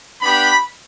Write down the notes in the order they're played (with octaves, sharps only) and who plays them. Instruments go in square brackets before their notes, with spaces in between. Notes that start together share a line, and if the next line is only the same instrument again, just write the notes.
[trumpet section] B3 D4 G4 B5